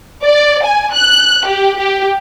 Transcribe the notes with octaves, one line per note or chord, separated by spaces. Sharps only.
D5
G#5
F#6
G4
G4